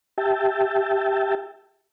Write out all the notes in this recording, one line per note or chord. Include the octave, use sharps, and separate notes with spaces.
G4 E5 G5 A5